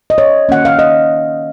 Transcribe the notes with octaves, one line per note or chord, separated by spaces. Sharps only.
D#5
C#5
D#3 A#3 C#4 F#5
F5
D#5